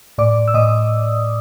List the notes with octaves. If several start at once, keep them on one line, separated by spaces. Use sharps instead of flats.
A2 D5 D6
E6
A2 D#5 D#6